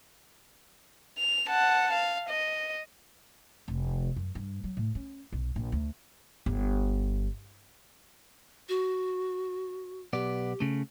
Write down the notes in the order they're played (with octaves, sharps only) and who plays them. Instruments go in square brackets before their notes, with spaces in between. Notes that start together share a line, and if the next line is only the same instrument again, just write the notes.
[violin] F7
F#5 A5
F5
D#5
[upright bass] F1
F#2
G2
F#3
A2
C#4
B1
A#1
D2
G1
[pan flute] F#4
[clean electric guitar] B1 B3 D5 [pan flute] G4
[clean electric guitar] C#3 A3